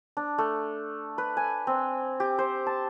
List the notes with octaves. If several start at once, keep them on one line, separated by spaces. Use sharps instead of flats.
D4
A3
B4
G#5
C4
G4
C5
A5